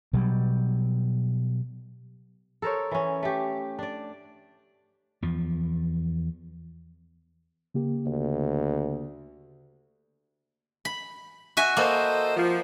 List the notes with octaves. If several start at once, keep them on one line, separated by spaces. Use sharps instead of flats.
B2 F#3 G3
A4 A#4 C5 C#5
E3 C#4
A3 G4
D4 D5
E2 F3
C#3 A#3 G4
D2
B5
F#4 E5 G#5
A#3 A4 C5 D#5
F3